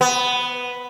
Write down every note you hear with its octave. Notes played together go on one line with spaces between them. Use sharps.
B3